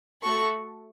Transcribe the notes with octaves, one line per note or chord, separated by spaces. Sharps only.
A3 F#4 A4 C#6